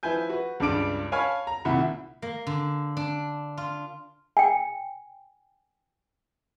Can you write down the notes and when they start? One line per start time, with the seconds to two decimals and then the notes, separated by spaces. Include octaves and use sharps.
0.03 F3 E4 B4 G#5 G6
0.29 F#4 B4
0.60 C#2 G2 C#3 D4 D6 D7
1.12 C#5 F5 G#5 A5 B5 F6
1.47 A#5
1.65 C2 A#2 D#3 E4 F#5 B5
2.22 A#3
2.47 D3
2.97 D4
3.57 F4
4.37 G5 G#5